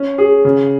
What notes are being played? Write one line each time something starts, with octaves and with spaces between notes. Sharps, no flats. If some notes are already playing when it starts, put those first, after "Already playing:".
Already playing: C#4
G#4
C#3